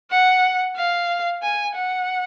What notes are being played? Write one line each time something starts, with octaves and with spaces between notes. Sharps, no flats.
F#5
F5
G#5
F#5